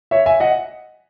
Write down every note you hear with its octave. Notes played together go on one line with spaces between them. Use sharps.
C#5 E5
E5 G#5
D#5 F#5